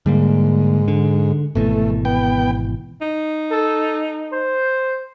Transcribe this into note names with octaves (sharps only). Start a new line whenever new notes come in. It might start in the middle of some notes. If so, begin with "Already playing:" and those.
G#2 D3 G3 A#3
D3
G#1 B2 E3 A3
B3 G5
D#4
A4
C5